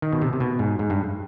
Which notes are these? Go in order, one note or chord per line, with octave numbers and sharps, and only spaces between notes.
D#3
B2
C3
C3
B2
G#2
G#2
G2